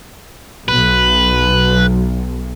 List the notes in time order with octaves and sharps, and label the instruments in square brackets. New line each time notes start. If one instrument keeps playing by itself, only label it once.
[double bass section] B1 [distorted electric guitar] B4